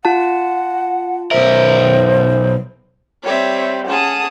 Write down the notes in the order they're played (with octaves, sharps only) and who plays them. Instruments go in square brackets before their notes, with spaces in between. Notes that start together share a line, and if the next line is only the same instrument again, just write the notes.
[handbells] F4 A5 [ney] F#5
[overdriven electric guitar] B1 A#4 [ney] C5 [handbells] E5
[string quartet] G3 C4 G4 [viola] C#5 E5
[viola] C#4 G#4 [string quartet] F#5 A5 D#6